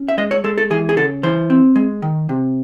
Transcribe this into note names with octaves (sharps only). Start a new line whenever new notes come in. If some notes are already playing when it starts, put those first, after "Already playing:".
Already playing: C#4
E5
G#3 D#5
C#5
G#3 A4
A4
E3 G#4
G#4
C#3 A4
E3 C5
C4
G#3
D#3
C3